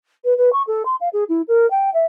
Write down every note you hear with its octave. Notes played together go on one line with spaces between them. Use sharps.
B4
B4
C#6
A4
C6
F5
G#4
E4
A#4
G5
E5